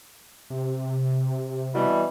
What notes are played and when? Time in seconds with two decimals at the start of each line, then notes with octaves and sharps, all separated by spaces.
0.50 C3
1.74 B2 E3 G3